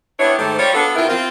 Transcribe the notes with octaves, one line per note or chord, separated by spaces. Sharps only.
B3 D4 E4 G4 C#5
G#2 D#3 A3 G4 C5
G3 F4 C#5
B3 D4 F#4 A4
B2 C4 E4 F4 G4 A#4
C4 F4